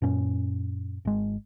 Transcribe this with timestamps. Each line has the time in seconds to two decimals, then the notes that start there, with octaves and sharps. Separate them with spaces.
0.02 F#2 A#2 C#4
1.05 G#1 G#3